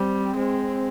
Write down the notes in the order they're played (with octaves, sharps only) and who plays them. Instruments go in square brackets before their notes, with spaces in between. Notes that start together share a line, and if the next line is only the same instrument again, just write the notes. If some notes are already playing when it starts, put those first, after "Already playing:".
Already playing: [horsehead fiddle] G3 [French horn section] C4
[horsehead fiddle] G#3